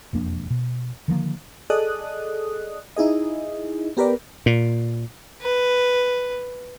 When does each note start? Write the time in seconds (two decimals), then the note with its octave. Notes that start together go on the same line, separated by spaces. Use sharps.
0.13 E1 F2 A#3 D4
0.50 B2
1.08 D3 D#3 F3 A#3
1.70 G#4 A4 D5 D#5 D#6 F#6
2.96 D#4 E4 G#4 D#5
3.97 B3 G4 A#4 B4 D5
4.46 A#2
5.42 B4